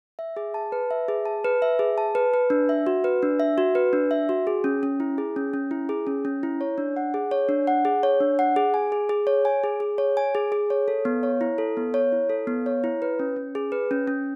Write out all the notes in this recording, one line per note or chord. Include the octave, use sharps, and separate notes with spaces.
E5
G#4
A5
B4
E5
G#4
A5
B4
E5
G#4
A5
B4
B4
D4
E5
F#4
B4
D4
E5
F#4
B4
D4
E5
F#4
G#4
C#4
C#4
E4
G#4
C#4
C#4
E4
G#4
C#4
C#4
E4
C#5
D4
F#5
G#4
C#5
D4
F#5
G#4
C#5
D4
F#5
G#4
G#5
G#4
G#4
C#5
G#5
G#4
G#4
C#5
G#5
G#4
G#4
C#5
A4
B3
C#5
E4
A4
B3
C#5
E4
A4
B3
C#5
E4
B4
C#4
C#4
G#4
B4
C#4
C#4